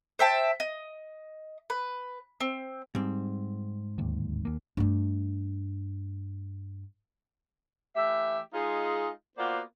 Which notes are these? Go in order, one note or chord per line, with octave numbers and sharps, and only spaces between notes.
C5 E5 G5 A5
D#5
B4
C4
G#2 G3 C4
D1 D#2
D#2 A#3
G2 A3
E3 A3 G4 E5
G#3 D#4 F4 G#4
A#3 B3 F4 F#4 C5 D5